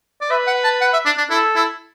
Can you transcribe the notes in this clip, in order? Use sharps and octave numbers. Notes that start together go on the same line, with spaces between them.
D5
B4 E5
F#5
A5
F#5
E5
D4
D4
E4 A4
E4